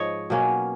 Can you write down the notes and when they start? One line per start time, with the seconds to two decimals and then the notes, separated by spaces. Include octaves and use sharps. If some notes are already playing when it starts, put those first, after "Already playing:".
Already playing: G#2 F3 C#5 D#5
0.30 B2 F#3 A#3 C#4